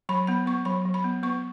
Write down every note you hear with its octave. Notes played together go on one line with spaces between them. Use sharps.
F#3 B5
B3 B5
B3 C#6
F#3 B5
F#3
B5
B3
B3 C#6